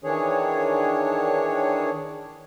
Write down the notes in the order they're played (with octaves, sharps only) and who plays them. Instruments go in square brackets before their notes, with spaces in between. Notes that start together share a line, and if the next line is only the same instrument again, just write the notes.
[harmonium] D#3 E3 D4 G#4 C#5